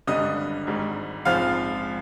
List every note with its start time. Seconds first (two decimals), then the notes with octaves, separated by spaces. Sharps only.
0.07 G#1 G2 D3 G3 D#5 D#6
0.67 G#1 G#2 G3
1.25 A#1 G#2 F3 C4 F5 F6